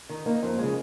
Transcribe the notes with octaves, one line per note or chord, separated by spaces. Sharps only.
D#3
A#3 D#4
F2
C#3 G#3